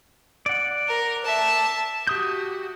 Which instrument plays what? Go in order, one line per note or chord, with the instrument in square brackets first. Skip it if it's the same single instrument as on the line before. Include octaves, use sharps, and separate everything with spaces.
[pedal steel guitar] D5 F#5
[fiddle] A#4
E5 A5
[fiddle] F#4 [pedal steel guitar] G4 D#6 G6